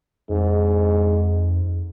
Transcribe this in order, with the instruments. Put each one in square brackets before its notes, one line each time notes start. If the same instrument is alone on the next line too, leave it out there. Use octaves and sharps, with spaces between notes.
[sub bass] F2 [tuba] G#2